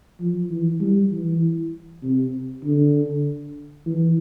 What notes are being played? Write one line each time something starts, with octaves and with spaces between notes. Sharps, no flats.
F3
E3
G3
E3
C3
D3
E3